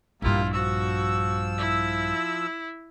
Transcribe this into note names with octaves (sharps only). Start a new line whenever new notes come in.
A#1 G2 G3 A#3 E4 F4
F3 F#4 E6
E4